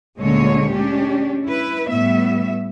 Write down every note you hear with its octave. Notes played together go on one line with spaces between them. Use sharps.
D2 A#2 D3 G#3 C#4 C#5
G#3 C#4 D4 G4
E4 B4
A2 G3 B3 E5